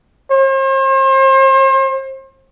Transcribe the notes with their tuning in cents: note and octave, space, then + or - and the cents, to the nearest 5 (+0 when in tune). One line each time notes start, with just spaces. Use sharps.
C5 +40